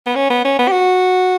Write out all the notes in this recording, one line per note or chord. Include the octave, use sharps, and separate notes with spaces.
B3
C#4
B3
C#4
B3
G4
F#4